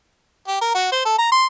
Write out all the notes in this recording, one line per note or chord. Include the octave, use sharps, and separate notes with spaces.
G4
A#4
F#4
C5
A4
A#5
C6